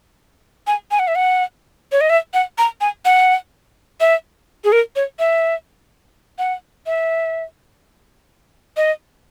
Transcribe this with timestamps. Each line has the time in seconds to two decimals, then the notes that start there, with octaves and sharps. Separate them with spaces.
0.67 G#5
0.91 G#5
0.99 F#5
1.08 E5
1.15 F#5
1.92 C#5
2.01 D#5
2.10 E5
2.34 F#5
2.58 A#5
2.81 G#5
3.05 F#5
4.00 E5
4.64 G#4
4.72 A#4
4.96 C#5
5.19 E5
6.38 F#5
6.86 E5
8.77 D#5